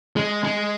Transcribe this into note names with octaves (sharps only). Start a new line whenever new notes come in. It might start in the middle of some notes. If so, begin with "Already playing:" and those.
G#3
G#3